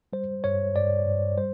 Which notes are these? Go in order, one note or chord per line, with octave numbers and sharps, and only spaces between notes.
G3 C5
G2 C#5
G2 D5
G2
G3 C5